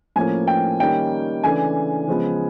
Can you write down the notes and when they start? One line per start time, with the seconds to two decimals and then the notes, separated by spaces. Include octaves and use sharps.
0.16 A2 F3 A#3 C#4 G#5
0.47 G5
0.80 D#3 G3 A#3 C#4 G5
1.43 C#3 E3 A3 D4 G#5
2.07 C#3 F3 G#3 B3